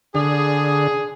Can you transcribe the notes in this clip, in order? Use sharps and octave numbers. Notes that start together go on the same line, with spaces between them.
D3 G#4